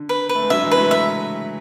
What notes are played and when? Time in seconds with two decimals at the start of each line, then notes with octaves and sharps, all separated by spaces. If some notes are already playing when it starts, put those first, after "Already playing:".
Already playing: D3
0.09 B4
0.29 B4
0.35 A3
0.42 G#3
0.50 D3 F#3 E5
0.64 E3 G#3
0.71 B4
0.78 F#3 A3
0.91 E5